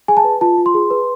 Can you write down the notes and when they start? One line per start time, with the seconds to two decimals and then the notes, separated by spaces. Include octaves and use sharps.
0.08 G#4 G#5
0.17 A5
0.25 B4
0.41 F4 A5
0.58 F4
0.66 C6
0.74 G#4
0.91 B4